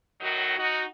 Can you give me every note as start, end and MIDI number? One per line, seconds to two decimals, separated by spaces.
0.21 0.57 45
0.21 0.57 51
0.21 0.57 54
0.21 0.57 63
0.21 0.57 66
0.58 0.82 63
0.58 0.82 66